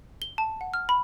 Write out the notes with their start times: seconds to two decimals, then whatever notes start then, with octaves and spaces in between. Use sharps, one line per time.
0.22 G7
0.38 A5
0.61 F#5
0.74 F6
0.89 B5